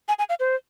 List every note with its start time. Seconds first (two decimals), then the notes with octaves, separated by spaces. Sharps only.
0.08 G#5
0.19 G#5
0.29 F5
0.40 C5